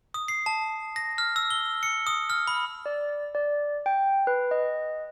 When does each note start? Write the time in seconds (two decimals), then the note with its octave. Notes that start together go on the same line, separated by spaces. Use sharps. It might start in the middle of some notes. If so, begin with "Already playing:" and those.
0.14 D#6
0.28 C7
0.46 A5
0.96 A#6
1.18 F6
1.36 E6
1.50 G7
1.83 C#7
2.07 D#6
2.30 F6
2.47 B5
2.86 D5
3.35 D5
3.86 G5
4.27 B4
4.51 D#5